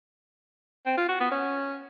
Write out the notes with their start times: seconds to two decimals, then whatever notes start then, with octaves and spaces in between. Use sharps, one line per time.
0.86 C4
0.97 F4
1.09 F#4
1.20 B3
1.31 C#4